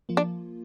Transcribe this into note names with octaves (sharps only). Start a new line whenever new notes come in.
F3 A#3 F4
D4